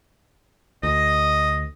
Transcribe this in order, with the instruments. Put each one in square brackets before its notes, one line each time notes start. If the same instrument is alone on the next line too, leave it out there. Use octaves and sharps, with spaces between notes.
[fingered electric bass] D2 [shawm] D#5